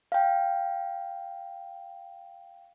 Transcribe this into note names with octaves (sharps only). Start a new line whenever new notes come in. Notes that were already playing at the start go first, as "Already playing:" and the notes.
F5 G5